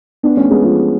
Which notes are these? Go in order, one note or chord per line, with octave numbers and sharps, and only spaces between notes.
B3 D4
A3 C#4
G#3 B3
F3 G#3